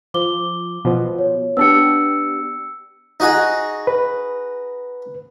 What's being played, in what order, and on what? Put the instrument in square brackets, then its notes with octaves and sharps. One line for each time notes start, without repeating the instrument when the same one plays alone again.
[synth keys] F3 [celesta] D6 G7
[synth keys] B2 F3
[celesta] C#5
[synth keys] B3 D4 G4 [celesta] E6 C#7
[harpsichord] D#4 F#4 G#4
[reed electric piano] B4